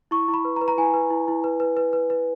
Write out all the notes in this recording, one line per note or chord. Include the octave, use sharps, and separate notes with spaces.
E4 C#6
E4
B5
B4
A#5
B4
A#5
E4 G#5
B4
E4
E4
B4
B4
B4
B4
B4